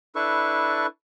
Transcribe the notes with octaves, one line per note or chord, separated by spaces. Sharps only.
D4 E4 A4 B4 C#6